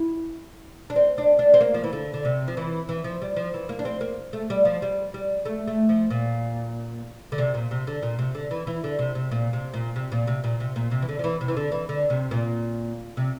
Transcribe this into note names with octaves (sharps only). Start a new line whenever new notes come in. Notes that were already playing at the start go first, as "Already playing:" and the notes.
Already playing: E4
D4
C4
D4
D4
C4
A#3
F3
E3
D3
D3
C3
F3
E3
E3
F3
G3
F3
E3
A#3
D4
C4
A#3
A3
G3
F3
G3
G3
A3
A3
F3
A#2
D3
C3
A#2
C3
D3
A#2
C3
D3
E3
E3
D3
C3
C3
A#2
C3
A#2
C3
A#2
C3
A#2
C3
A#2
C3
E3
D3
F3
E3
C3
E3
D3
E3
D3
C3
A#2
C3